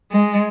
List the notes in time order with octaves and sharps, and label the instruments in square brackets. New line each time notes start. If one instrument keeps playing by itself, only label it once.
[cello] G#3